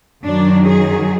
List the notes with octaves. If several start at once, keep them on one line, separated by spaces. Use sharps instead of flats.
F#2 D#3 F#3 D4
G#4